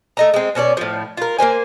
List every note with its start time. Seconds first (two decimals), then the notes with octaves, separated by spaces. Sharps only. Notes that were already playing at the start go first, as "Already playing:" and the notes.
0.17 A3 D#5 A#5
0.34 G#3 C4
0.55 B2 C#4 C#5 D5
0.77 A2 F3
1.17 F4 A#4
1.39 A#3 C#4 C5 G#5